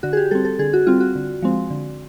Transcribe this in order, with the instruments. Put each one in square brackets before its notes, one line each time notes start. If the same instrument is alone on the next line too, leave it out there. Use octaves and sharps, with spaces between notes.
[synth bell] D3 F#4
G#4
G4
G3 C4 A4
A4
D3 G#4
F#4
G3 C4 F4
F#4
D3
F3 G#3 C4
D3